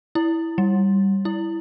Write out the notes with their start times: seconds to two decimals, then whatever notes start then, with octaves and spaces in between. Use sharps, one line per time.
0.15 E4
0.58 G3
1.25 E4